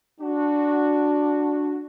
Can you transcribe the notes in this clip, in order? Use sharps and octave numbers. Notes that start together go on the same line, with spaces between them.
D4 F#4